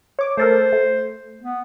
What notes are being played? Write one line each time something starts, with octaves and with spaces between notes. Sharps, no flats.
C#5 D6
A3 A4 A#4 C5
A3
B3